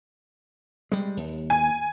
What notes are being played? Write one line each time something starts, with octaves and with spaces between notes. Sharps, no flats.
G3 G#3
D#2
G#5